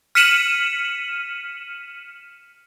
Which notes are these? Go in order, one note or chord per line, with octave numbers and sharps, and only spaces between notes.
F6 B6 C#7 D#7 E7 F#7